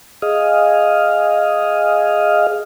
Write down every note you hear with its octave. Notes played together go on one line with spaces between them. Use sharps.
G#4 D#5 F5